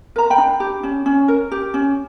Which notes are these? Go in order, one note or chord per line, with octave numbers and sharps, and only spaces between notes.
A#4 A#5
G5 B5
D4
G4
C#4
C#4
A#4
G4
C#4